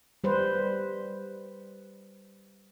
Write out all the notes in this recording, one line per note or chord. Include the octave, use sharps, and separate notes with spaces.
G3 B4 C5